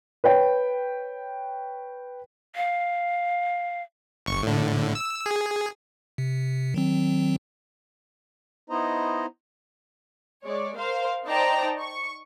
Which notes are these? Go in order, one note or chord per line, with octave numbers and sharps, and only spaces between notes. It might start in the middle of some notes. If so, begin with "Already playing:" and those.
B4 C#5 G5
F5
G1 C#6
A2 D3
E6
G#4
C3
D#3 F#3 C4
B3 D#4 E4 C5 D#5 A#5
G#3 C#5 D5
A#4 C5 F5
D#4 C5 D5 G5 A5 A#5
C#6